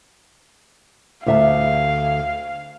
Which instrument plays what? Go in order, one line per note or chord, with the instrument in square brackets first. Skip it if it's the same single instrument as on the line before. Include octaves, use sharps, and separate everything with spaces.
[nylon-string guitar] D2 E5 A5 [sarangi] F5